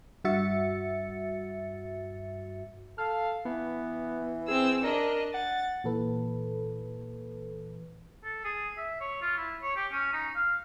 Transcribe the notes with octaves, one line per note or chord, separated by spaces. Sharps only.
G2 F#4 E5 A6 C#7
A4 F5
E3 B3
C4 G#4 E6
D4 A#4 D#5
F#5 A6
A#2 E3 A4 B4
A4
G#4
E5
C#5
F4
E4
C#5
G4
C#4
D#4
F5